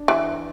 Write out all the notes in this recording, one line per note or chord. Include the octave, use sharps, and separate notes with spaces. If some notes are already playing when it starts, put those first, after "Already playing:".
Already playing: D4
E3